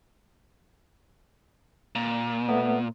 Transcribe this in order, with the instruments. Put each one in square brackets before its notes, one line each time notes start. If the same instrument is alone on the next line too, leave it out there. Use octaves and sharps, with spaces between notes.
[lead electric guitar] A#2
[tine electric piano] A3 B3